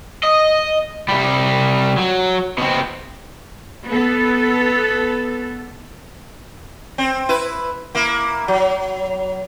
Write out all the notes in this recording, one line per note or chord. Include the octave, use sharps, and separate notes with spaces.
D#5
C3 G3
F#3
B2 C4
B3 A4
C4
E4 B4
A#3 E4
F#3